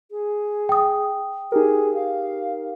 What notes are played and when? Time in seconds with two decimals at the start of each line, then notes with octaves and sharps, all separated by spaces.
0.11 G#4
0.69 G5 D#6
1.52 D#4 G4 G#4 A#4
1.94 F5